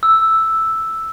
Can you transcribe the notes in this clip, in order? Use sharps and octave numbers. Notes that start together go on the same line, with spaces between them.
E6